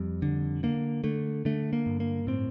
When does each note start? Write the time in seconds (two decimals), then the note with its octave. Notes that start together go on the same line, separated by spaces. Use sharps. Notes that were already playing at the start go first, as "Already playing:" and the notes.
Already playing: F2 G3
0.22 D3
0.63 D3 A#3
1.04 D3 A3
1.45 D3 A3
1.73 A#3
1.86 G2
2.00 A#3
2.27 A2 C4